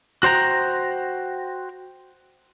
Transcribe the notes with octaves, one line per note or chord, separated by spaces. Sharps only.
F#4 C5 G5 A#5